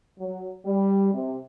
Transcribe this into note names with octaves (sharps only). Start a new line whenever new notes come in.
F#3
G3
C3